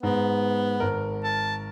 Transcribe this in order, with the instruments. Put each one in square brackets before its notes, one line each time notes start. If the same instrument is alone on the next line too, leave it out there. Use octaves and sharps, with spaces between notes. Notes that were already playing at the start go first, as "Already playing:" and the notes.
[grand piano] G#2 [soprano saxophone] B3
[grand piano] G#1 A#4
[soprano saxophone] A5